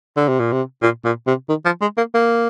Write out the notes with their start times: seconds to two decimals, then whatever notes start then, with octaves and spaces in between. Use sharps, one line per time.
0.16 D3
0.28 C3
0.39 A#2
0.52 C3
0.82 A#2
1.05 A#2
1.27 C3
1.49 D#3
1.65 F3
1.81 G#3
1.97 A#3
2.14 A#3